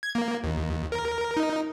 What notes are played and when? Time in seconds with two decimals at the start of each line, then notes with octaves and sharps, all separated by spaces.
0.03 G#6
0.15 A#3
0.44 D#2
0.92 A#4
1.37 D#4